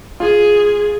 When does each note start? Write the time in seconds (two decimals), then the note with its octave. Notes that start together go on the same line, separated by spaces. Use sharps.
0.20 F4 G#4